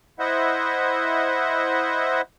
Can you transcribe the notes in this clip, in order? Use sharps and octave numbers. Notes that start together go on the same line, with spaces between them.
E4 C5 D#5 E5 F#5